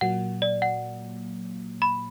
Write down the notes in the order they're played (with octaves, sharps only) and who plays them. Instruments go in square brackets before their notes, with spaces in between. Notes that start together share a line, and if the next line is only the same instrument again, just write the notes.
[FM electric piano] A#2 F#3 A#3 [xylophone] F#5
[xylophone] D5
F#5
B5